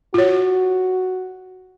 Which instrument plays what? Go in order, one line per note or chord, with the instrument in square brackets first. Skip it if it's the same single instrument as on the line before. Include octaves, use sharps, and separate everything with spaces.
[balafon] F4 C#5 [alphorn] F#4